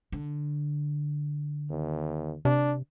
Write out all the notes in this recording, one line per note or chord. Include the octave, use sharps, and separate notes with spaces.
D3
D#2
C3 D4